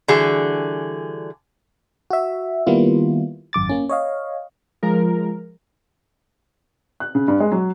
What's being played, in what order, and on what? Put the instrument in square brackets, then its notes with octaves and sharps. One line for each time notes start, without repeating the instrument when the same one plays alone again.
[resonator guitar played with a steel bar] D3 E3 G3 F#4 G#4
[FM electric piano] F#4 E5
D#3 G3 A#3 B3 E4 F4
G#1 F#2 D6 A6
A#3 C#4
C#5 D#5 F5
[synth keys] F3 G#3 A#4
[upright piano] F#6
C#3
G2
G#3
F#3